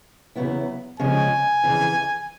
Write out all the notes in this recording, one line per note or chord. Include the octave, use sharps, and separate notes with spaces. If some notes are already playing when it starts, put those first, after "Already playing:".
E2 C#3 F#3 B3 E4
C#3 F3 G#3 G#5
F2 C#3 E3